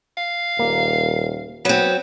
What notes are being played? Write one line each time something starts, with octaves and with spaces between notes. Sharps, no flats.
F5
D#1 A#3
F#3 B3 C4